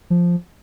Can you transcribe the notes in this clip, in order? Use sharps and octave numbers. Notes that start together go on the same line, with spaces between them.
F3